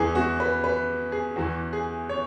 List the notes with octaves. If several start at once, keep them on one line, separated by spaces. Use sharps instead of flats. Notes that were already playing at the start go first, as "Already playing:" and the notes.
Already playing: E2 E3 G#4
F#4
B4
B4
G#4
E2 E3 F#4
G#4
C#5